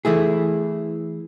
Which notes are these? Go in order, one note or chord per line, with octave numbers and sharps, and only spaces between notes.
E3 A3 E4 G#4